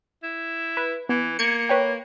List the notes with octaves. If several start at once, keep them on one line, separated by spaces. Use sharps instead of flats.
E4
B4
E3 B3
A#3 G#6 C#7
B4 C#5 G5